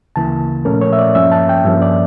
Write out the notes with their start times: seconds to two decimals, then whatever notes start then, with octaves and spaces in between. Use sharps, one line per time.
0.16 D2 C#3 E3 A#3 A5
0.65 A#2 F3 A3 C#4 A#4
0.81 C#5
0.93 E5
0.99 D5
1.15 G2 F3 A#3 C#4 E5
1.32 A5
1.49 G5
1.65 G2 F3 A#3 C#4 E5
1.82 D5